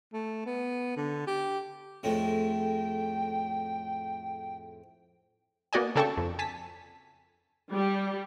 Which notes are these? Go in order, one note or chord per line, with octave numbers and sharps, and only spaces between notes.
A3
B3
D3
G4
F2 A2 G#3 G5
A#3 B3 F#4 D5 D#5 G#5
C#3 D4 A4 G5 A5 C#6
F2
G#5 A5 B6
G3